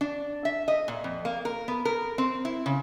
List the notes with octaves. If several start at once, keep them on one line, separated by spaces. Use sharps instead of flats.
D4
E5
D#5
A#2
F2
A#3
A#4
B3
A#4
C4
E4
C#3